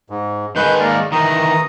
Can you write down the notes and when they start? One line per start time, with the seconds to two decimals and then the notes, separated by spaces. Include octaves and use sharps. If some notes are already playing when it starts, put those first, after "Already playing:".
0.10 G#2
0.56 D#3 G#3 G#4 B4 G6
0.80 A#3 A#4 D5
1.12 D#3 E3 A#5 D#6